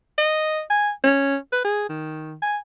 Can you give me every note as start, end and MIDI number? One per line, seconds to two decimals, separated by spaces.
0.18 0.61 75
0.70 0.91 80
1.04 1.37 61
1.52 1.60 71
1.65 1.88 68
1.89 2.36 51
2.42 2.57 80